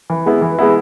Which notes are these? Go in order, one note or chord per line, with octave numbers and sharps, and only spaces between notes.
E3
G#3 B3 E4
E3
G#3 B3 E4